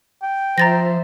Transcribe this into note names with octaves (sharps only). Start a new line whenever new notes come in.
G5
F3 C5 E5 A#5 A6 A#6